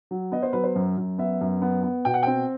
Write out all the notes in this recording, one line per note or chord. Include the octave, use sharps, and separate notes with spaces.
F#3
B3 D#5
C5
F#3 B4
C5
F#2
F#2
B3 E5
F#2
B3
B3
B2 G5
F#5
C4 G5